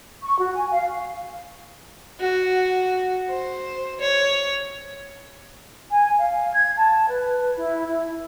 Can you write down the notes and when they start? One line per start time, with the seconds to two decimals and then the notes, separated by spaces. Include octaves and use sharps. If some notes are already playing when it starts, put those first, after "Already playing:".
0.23 C#6
0.39 F#4
0.55 G#5
0.72 F5
2.20 F#4
3.30 C5
4.00 C#5
5.90 G#5
6.18 F5
6.53 G#6
6.77 A5
7.08 B4
7.56 E4
7.88 E4